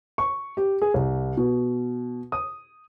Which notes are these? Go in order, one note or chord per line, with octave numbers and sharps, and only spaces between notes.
C#6
G4
G#4
C2
B2
D#6